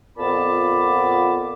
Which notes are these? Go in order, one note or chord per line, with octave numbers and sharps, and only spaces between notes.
F2 A#2 B3 A5 B5 D6